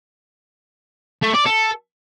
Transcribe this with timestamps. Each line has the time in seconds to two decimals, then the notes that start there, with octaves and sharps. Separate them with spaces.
1.22 A3
1.34 D5
1.46 A4